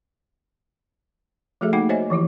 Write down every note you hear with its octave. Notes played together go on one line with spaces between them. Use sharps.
F3 A3 F#4 G#4 A4 E5
A#3 D#4 F#5 G5 D6
F#4 C5 C#5 D#5 E5 G#5
E3 F3 E4 G4